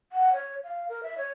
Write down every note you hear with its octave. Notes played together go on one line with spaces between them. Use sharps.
F#5
C#5
F5
A#4
E5
C#5